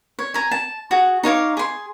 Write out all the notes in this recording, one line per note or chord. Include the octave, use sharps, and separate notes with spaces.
C#5
G#5 A#5
A5
F#4 G#4
D#4 C#5 F5 D6
G#4 C6